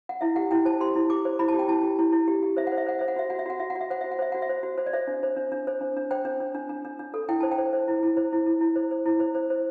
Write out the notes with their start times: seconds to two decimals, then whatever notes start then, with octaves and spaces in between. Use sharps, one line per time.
0.09 F#5
0.21 E4 E5
0.36 G4 F#5
0.51 E4 G5
0.65 C5 A5
0.80 G4 C6
0.95 E4
1.10 G4 D6
1.25 C5
1.39 E4 B5
1.48 A5
1.54 G4 G5
1.68 E4 A5
1.83 G4
1.99 E4
2.12 E4
2.28 G4
2.43 G4
2.57 C5 E5
2.67 C5 F#5
2.78 E5
2.86 C5 F#5
2.99 C5 E5
3.08 F#5
3.16 F#4 E5
3.30 F#4 F#5
3.39 E5
3.46 F#4 F#5
3.59 F#4 E5
3.70 F#5
3.75 F#4
3.81 E5
3.90 C5 F#5
4.01 F#4 E5
4.11 F#5
4.19 C5 E5
4.32 F#4 F#5
4.42 E5
4.49 C5
4.63 F#4
4.78 C5
4.86 D5
4.93 C5 E5
5.07 D4
5.23 C5
5.37 D4
5.52 D4
5.67 C5
5.81 D4
5.96 D4
6.11 C5 G5
6.25 D4
6.40 D4
6.54 D4
6.69 D4
6.85 D4
6.99 D4
7.14 A4
7.29 E4 G5
7.40 C5 A5
7.51 G5
7.58 C5
7.73 C5
7.88 E4
8.03 E4
8.17 C5
8.33 E4
8.46 E4
8.61 E4
8.76 C5
8.91 C5
9.06 E4
9.20 C5
9.35 C5
9.50 C5